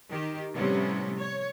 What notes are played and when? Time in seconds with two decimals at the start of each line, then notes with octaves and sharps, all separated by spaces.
0.11 D#3 G4
0.55 A2 C3 F3 G3 B3 C#4
1.17 C#5